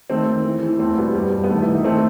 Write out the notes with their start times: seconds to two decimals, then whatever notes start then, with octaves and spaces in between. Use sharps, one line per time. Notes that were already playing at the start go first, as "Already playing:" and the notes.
0.10 D#3 A3 C4
0.28 D#3
0.45 E3
0.63 E3
0.79 E2 A3 C4
0.97 B2 G3 B3
1.15 G2 G3
1.32 G2
1.44 B3
1.49 D#3 A3
1.62 E4
1.68 D#3
1.74 D#4
1.84 D#3 A3 C4